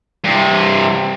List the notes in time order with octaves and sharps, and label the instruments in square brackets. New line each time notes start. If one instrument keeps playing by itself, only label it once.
[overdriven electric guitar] G2 C3